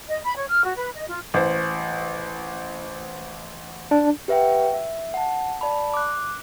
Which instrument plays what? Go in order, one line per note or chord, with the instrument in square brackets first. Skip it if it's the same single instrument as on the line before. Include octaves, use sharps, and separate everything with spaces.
[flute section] D#5
B5
C#5
F6
F#4
B4
D#5
F4
[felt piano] A1 C5
[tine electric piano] D4
[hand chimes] G4 B4 E5 F#5 G5
E5
F#5 A5
D5 A5 B5
D6 F#6